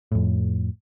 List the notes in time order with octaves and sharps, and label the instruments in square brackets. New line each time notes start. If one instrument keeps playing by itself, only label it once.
[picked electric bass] F2 A2